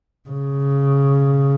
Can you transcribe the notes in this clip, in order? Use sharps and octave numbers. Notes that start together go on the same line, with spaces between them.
C#3